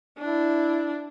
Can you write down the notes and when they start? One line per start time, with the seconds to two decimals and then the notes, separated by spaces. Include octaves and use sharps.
0.19 D4 E4